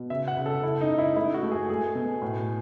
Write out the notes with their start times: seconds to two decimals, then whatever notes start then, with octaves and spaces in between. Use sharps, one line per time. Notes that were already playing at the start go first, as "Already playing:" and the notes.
Already playing: B2
0.10 C#3 E5
0.28 F#5
0.37 C#3
0.46 A4
0.63 C#3 E4
0.81 D#4
0.89 C#3
0.98 E4
1.16 A3 E4
1.34 F#4
1.43 A3
1.52 G#4
1.69 A3 G#4
1.95 B2
2.22 A2